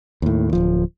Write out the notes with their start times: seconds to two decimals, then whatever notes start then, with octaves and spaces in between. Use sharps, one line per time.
0.22 D#2 A2
0.53 D1 F3